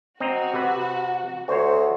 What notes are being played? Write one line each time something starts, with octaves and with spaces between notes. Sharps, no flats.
C4 F#4 D#5 A#5
C3 B4
D2 F#4 C5 C#5